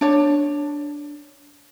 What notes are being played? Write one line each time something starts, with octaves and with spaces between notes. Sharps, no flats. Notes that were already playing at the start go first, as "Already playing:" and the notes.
D4 C#5